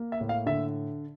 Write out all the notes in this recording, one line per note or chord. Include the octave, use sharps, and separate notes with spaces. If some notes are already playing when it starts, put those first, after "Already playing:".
Already playing: A#3
E5
A2
F5
D3 E5